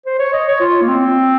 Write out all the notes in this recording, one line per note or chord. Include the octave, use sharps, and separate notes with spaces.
C5
C#5
D#5
C#5
F4
A#3
C4